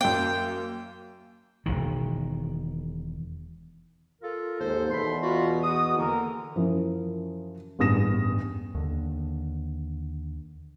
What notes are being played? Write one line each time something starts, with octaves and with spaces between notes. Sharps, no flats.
F#2 A#3 G5
E1 A#1 D#3
F4 A4 A#4
D#2 G#2 A4 C5
E2 B2 A4 B5 C6
F4 F#4
F#4 D#6
D3 E3 A#3 A#4
F#2 E3 F3
A1 E2 G2 D#6 A#6 E7
D#2 D3